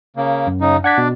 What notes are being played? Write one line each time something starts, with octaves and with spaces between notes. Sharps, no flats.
C#3 A#3
F#2
C#3 D#4
D4 F#5 G#6 B6
B2